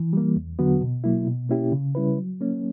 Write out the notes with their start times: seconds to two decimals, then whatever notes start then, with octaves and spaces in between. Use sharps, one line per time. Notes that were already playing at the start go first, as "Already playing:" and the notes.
Already playing: E3
0.13 G3 A#3
0.36 E2
0.59 D3 F#3 B3 F#4
0.81 B2
1.04 F#3 A#3 E4
1.27 B2
1.49 A#3 C#4 E4 G4
1.72 C#3
1.95 G3 C#4 E4 B4
2.18 F#3
2.41 A#3 C#4